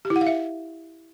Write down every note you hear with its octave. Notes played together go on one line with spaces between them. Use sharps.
G4
E4
F#5
F5
E5